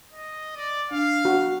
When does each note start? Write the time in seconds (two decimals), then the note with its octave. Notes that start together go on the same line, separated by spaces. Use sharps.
0.13 D#5
0.56 D5
0.91 D4 F5
1.25 F#4